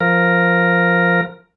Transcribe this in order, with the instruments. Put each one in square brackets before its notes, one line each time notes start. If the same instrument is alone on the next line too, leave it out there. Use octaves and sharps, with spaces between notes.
[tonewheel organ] F3 A#4